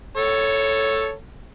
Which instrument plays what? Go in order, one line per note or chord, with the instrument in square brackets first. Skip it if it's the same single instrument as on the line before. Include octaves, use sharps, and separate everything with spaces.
[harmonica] A4 C#5